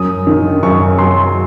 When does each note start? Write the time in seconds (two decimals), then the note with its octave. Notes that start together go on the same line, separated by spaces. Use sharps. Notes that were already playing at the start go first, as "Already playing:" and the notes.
Already playing: F#2 D#6
0.27 D#3
0.63 F#2 C#6
0.98 F#3 C6